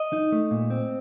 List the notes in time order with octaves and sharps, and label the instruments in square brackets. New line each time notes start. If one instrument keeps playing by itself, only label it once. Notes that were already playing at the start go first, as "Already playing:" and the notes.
Already playing: [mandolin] D#5
[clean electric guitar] D#4
A3
A#2
C4